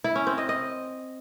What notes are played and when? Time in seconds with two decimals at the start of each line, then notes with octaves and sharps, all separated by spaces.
0.04 E4
0.16 C#4
0.27 C4
0.38 D#5
0.49 D#5